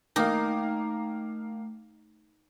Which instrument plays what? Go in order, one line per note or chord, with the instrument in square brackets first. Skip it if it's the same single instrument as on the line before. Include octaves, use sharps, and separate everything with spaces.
[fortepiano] D#3 A#3 [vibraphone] A3 [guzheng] D#4 [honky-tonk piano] F5 A#5 D6